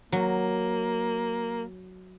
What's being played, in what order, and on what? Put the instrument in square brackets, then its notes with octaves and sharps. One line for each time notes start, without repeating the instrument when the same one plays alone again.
[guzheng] F#3 [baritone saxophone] A#3